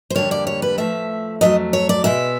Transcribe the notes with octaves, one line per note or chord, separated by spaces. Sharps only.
C5
F2 D3 G3 A#3 C#5
D5
C#5
B4
A2 F3 A3 E5
F2 C#3 F#3 A3 D#5
C#5
D5
B2 G#3 B3 E5